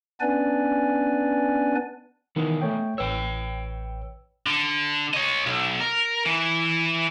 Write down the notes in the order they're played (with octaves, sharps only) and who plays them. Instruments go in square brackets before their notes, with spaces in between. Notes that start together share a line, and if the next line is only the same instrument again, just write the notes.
[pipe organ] B3 C#4 D4 B4 D5 G#5
[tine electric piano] D#3 E3 [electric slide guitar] G#3 B3
[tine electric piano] A3 C#5 G5
[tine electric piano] A1 B4 E6 [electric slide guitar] C#5 G5
[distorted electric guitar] D3
C#5 D#5
B1
A#4
E3